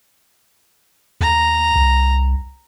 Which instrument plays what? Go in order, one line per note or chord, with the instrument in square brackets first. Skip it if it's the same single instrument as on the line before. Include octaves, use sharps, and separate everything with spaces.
[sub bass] D#2 [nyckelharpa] A#5
[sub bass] C2